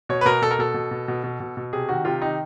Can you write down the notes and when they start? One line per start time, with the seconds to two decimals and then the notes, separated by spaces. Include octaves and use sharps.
0.09 B2 C#5
0.21 B4
0.25 B2 A#4
0.42 B2 A4
0.51 A#4
0.59 B2 A4
0.74 B2
0.91 B2
1.08 B2
1.24 B2
1.40 B2
1.57 B2
1.73 C3 G#4
1.89 D#3 F#4
2.05 C3 F4
2.22 D#3 D#4